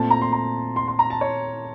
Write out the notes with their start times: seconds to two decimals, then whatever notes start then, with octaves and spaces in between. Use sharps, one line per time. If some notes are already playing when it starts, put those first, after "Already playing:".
Already playing: A#2 A3 C4 A5
0.10 A#5
0.21 C6
0.32 A#5
0.76 C6
0.88 C6
0.99 A#5
1.10 A5
1.21 C#5